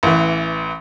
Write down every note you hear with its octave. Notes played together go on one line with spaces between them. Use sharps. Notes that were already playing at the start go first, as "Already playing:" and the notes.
A1 E3